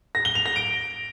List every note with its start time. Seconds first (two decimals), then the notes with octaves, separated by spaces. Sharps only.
0.15 A#6
0.25 G7
0.35 F7
0.46 A#6
0.56 D7